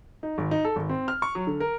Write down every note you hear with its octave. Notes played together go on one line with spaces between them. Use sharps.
D#4
G#1
D#4
A4
G#1
C4
F6
C#6
F#3
D3
A#4